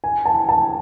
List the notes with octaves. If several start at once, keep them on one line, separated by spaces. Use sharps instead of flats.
G#5
A5
A5